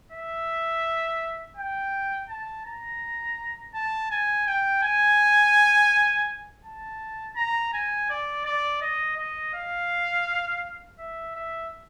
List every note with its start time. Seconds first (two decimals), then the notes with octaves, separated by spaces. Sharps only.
0.12 E5
1.57 G5
2.29 A5
2.66 A#5
3.74 A5
4.11 G#5
4.47 G5
4.83 G#5
6.64 A5
7.36 A#5
7.73 G#5
8.10 D5
8.45 D5
8.82 D#5
9.17 D#5
9.54 F5
10.99 E5
11.35 E5